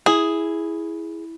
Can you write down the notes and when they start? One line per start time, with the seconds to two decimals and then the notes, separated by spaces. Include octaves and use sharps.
0.06 E4 G#4